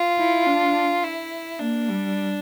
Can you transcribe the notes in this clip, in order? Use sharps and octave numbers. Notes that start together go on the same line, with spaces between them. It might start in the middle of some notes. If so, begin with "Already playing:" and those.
Already playing: F4
E4
D4
E4
A#3 D4
G3